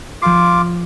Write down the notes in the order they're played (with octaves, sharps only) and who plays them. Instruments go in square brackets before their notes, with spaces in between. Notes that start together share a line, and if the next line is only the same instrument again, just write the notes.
[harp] F3 C7 [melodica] F4 D6